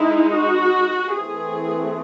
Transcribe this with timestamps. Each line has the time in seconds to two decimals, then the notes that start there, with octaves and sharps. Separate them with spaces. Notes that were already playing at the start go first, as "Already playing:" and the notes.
Already playing: G#3 D#4 E4
0.32 F#4
1.13 E3 A3 C4 G#4